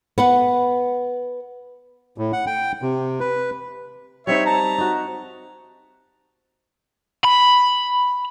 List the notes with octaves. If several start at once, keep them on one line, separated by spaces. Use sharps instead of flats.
B3 B4 F#5
A2
F#5
G5
C3
B4
G3 C4 D#4 C#5 E5
A5 A#5
D#4 F#4
B5